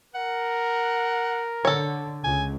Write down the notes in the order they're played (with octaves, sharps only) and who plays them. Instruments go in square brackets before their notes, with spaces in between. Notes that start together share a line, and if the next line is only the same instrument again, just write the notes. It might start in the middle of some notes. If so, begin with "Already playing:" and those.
[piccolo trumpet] A#4 [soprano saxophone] F#5
[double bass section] D3 [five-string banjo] A4 C#5
[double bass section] C#2 [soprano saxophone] G#5